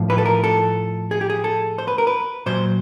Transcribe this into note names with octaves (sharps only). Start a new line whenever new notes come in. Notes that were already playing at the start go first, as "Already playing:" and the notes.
Already playing: A2 F3
B4
A4
A#4
A4
G#4
G4
G#4
A4
C5
B4
A#4
B4
A#2 F#3 C5